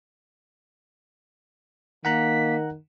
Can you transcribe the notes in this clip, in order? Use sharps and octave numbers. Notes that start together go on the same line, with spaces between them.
D#3 A#3 F#5 A#5 F#6 B6